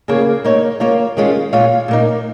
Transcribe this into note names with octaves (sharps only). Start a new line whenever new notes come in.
C#3 A#3 F4 G#4 C#5
A#3 D#4 C#5
A#3 F4 C#5 F5
D#3 G#3 C#4 F4
A#2 G#3 F4 C#5 F5
A#2 A#3 D#4